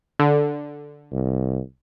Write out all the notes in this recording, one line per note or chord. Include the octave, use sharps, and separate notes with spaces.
D3
C2